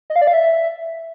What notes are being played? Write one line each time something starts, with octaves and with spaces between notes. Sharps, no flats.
D#5
F5
D5
F5
E5